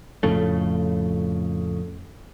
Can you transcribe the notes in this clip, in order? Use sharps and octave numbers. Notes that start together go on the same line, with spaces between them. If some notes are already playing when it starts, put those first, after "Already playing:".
F2 A2 C#3 A3